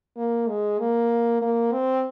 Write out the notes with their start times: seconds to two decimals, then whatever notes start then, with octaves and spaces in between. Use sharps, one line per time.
0.16 A#3
0.48 G#3
0.79 A#3
1.42 A#3
1.72 C4